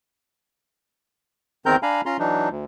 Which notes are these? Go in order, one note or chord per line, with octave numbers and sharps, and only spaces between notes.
E2 D#3 C4 A#4 A#5 G6
D4 F5 G#5 A#5 B5
C#4 F4 A#5 C6
E3 F#3 D4 D#4
D2